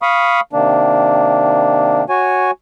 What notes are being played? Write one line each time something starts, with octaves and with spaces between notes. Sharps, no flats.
F5 B5 C#6 D#6
C3 D#3 A#3 D4
F#4 C#5 G#5